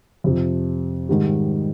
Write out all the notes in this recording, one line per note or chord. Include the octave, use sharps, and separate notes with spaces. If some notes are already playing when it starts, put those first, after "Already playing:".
F2 C3 F3
G#2 D#3 G3